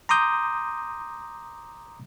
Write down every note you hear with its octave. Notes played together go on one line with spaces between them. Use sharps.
A#5 C6 D6 D#6 G6